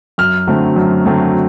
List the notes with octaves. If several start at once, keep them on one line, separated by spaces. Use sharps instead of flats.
F#2 F6
D3 F#3 A3 C4
F#2
D3 F#3 A3 C4